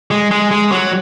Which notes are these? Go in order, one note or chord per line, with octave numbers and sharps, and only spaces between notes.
G#3
G#3
G#3
F#3